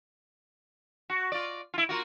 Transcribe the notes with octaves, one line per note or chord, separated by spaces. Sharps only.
F#4
F4 D5
E4 F4
A#3 F4 F#4